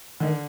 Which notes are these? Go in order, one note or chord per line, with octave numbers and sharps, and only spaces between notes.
D3 D#3